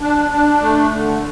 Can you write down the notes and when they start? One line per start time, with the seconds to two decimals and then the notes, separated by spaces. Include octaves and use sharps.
0.01 D4
0.31 D4
0.62 A3
0.92 D3